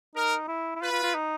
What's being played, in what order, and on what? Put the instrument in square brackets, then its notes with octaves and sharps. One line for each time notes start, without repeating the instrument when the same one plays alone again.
[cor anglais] D#4 [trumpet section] A#4
[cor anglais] E4
E4
[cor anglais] F4 [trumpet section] B4
[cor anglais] F4
F4
D#4